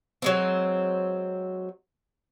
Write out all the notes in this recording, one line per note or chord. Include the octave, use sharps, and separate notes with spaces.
F#3 G#3 C4